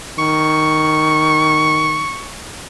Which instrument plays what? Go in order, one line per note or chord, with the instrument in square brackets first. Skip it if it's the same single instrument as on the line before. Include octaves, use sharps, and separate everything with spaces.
[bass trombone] D#3 [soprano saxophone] C#6